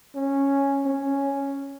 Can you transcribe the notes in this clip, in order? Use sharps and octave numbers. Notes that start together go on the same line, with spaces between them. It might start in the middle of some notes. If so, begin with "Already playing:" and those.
C#4
C#4